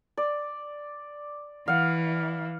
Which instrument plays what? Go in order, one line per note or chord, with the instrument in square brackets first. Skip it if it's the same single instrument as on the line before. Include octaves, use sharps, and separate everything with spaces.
[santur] D5
[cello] E3 [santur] F5 F#5